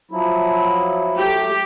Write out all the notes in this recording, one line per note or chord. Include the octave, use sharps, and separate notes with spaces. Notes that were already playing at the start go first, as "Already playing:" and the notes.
F3 F#3 E4
F#3 A3 G4